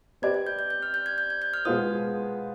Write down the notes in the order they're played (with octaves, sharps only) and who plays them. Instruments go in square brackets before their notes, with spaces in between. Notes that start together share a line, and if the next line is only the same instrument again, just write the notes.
[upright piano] C4 G4 B4 D5 [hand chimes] G#6
[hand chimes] G#6
G6
G6
G6
F6
G6
G#6
G6
G#6
G6
F6
[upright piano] B2 G#3 B3 F4 C5 [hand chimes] D#6